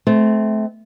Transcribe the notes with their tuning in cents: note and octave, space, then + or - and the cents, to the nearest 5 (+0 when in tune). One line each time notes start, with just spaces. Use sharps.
A3 -25 C4 -10